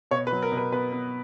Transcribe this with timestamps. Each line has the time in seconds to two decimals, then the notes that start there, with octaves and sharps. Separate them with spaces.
0.11 B2 C#5
0.27 B4
0.32 F#3
0.43 A#4
0.52 B2
0.57 B4
0.72 B3 B4
0.92 B3